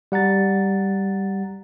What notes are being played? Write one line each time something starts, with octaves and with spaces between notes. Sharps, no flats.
G3 F#5 A#5 A6